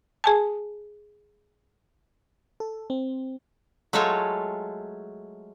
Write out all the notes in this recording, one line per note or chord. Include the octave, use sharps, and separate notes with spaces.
G#4 G#5 A5
A4
C4
F#3 G#3 A3 F4 A4 C#5